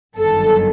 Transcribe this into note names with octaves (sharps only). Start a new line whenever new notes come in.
G1 F#2 D#3 A4